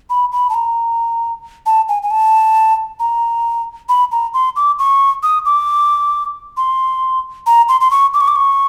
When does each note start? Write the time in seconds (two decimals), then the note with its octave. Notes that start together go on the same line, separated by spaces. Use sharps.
0.10 B5
0.32 B5
0.50 A5
0.54 A#5
1.66 A5
1.89 G#5
2.03 G#5
2.11 A5
3.00 A#5
3.89 B5
4.12 A#5
4.34 C6
4.56 D6
4.79 C#6
5.23 D#6
5.46 D6
6.57 C6
7.47 A#5
7.69 C6
7.81 C6
7.91 C#6
8.14 D6
8.21 C#6
8.28 D6
8.36 C#6